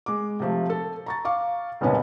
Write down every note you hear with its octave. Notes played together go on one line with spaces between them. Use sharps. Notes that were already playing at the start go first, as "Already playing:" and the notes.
G#3 D6
C3 F3 A3
A4
A#5 C#6 A6
F5 C#6 D6
F#1 C2 A#2 B3 C#4 A5